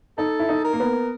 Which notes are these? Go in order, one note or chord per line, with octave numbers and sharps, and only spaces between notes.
D#4 A4
E4
D#4
A#4
A#3
B3